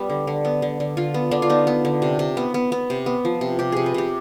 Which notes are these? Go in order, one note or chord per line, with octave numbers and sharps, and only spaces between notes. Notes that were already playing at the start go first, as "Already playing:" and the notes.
Already playing: G3 B3
D3
D3
B3
D3
D3
D3 F4
B3
D3 D4
F4
B3 D#4
B3
D3
C3
C3
B3
B3
B3
C3
B3
F3
C3
C3 G4
C3 G#4
B4
C3 G4